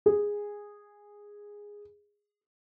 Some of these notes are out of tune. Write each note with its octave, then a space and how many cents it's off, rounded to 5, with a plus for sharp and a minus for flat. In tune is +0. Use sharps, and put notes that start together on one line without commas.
G#4 -10